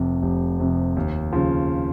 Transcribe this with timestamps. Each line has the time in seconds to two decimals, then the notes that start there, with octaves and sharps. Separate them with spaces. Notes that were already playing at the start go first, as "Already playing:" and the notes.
Already playing: F1 F2 C3
0.22 F1
0.60 F2 C3
0.96 D#2
1.33 C#3 F3